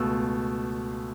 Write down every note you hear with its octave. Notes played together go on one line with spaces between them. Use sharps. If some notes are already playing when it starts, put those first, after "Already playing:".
Already playing: C#2 B2 A3 E6